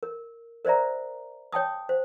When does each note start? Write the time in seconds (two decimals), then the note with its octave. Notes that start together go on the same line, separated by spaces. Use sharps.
0.03 A#4
0.65 A#4 C5 D5 E5 A#5
1.52 C#5 G5 A5 D#6
1.89 C5